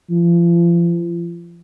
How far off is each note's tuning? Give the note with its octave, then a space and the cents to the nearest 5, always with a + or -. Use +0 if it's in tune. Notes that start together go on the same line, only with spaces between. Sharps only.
F3 -40